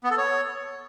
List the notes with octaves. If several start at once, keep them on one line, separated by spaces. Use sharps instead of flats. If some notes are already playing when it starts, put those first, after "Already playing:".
B3
A4
C#5